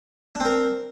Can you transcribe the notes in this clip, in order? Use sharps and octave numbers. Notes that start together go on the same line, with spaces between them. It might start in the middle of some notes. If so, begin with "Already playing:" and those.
C4 D4 A#4